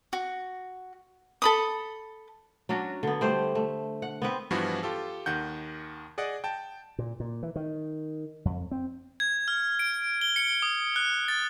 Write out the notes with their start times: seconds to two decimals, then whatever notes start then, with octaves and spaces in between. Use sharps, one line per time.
0.13 F#4
1.42 A4 B5 D#6
2.69 F#3 C#4 D4 F#4
3.03 D3 B3
3.21 G3 A3 C5
3.55 A3
4.02 F#5
4.22 B3 C4 B4
4.51 G2 E3 F3 B3 E4 F#4
4.83 F4 G4 A4
5.26 D#2 D#3 F#5 G6
6.18 G#4 D5 D#5 F#5
6.44 G5 A5
6.98 A#2
7.20 A#2
7.43 E3
7.56 D#3
8.45 F2
8.71 C4
9.20 G#6
9.48 F6
9.79 D7
10.21 G7
10.36 C#7
10.62 D#6
10.96 F#6
11.28 A6